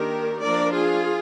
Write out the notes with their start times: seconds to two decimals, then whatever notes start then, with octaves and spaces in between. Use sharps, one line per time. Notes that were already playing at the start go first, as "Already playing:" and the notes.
Already playing: D#3 A#3 D4 G4 A#4
0.41 F3 A#3 D4 A#4 D5
0.71 F4 G#4